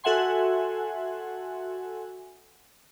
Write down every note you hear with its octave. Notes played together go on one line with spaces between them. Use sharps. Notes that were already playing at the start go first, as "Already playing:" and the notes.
F#4 A4 E5 F#5 G#5 C6